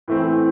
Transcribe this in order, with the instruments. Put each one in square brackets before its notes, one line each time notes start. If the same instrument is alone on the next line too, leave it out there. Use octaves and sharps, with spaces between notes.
[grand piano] A2 E3 A3 C4